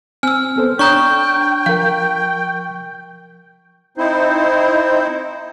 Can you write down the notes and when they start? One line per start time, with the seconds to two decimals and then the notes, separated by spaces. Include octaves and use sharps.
0.23 C4 G#5 E6 F6
0.56 B3 A4 C5
0.79 D4 C#5 G5 A#5 C#6 D#6 F#6 G6
1.66 F3 A#4 F5
3.98 C4 D#4 E4 C5